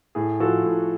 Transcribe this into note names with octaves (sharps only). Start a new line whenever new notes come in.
A2 G#4
F3 F#4 A4
A2